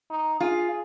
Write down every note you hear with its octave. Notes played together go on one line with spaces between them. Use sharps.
D#4
F4 G#4